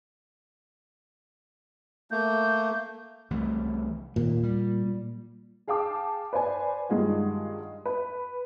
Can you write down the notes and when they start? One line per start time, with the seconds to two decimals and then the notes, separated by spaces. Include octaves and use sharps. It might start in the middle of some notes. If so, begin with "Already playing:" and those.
2.11 A3 A#3 G6
3.30 C2 E3 A3
4.16 D#2 A#2
4.43 G3
5.67 G#4 F5 G5 A5 D6
6.33 B4 C5 D5 G#5
6.89 G2 D#3 G#3 F4 F#5
7.86 B4